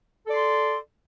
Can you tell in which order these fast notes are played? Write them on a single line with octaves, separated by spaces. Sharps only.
A4 D5 C6